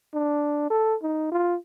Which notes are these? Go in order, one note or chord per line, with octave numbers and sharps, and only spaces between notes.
D4
A4
D#4
F4